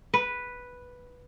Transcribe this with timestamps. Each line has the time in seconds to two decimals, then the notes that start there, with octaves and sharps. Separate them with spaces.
0.14 B4